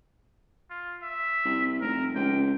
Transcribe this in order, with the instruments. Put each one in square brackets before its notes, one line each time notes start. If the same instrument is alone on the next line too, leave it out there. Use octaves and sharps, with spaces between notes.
[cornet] F4
E5
[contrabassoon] C2
[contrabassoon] F1 [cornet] A#4
[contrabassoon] C#2 [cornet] G5